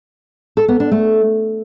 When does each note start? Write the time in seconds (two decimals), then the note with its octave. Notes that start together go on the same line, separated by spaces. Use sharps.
0.57 A4
0.68 B3
0.80 D4
0.91 A3